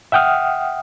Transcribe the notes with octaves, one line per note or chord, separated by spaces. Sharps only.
E5 F#5 G5 D#6 F6